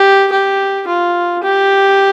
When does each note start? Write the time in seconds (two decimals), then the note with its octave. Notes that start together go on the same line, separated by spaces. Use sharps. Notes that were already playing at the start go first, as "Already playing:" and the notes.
Already playing: G4
0.32 G4
0.88 F4
1.43 G4